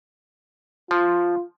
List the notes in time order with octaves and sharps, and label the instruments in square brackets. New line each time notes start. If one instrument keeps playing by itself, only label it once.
[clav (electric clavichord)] F3 [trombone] F4